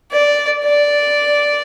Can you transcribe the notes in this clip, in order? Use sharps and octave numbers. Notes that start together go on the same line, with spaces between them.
D5
D5